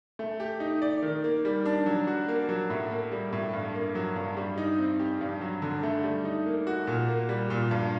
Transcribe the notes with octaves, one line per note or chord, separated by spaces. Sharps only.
A3
G4
D#4
D5
D#3
A#3
G3
D4
F#3
F#4
A#3
F#3
A2
A#3
G3
A2
G2
A#3
F#3
G2
G3
D#4
C4
G4
G2
F#3
D3
A3
G3
D#4
A#3
F#4
A#2
A#3
G3
A#2
G2